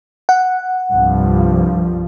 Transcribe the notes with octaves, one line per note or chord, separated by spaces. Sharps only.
F#5
C2 G2 F3